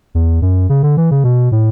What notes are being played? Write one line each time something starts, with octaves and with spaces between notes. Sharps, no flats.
E2
F#2
C#3
D3
E3
C#3
B2
A2